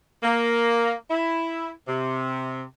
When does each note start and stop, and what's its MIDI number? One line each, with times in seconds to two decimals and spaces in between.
0.23 0.95 58
1.11 1.70 64
1.88 2.62 48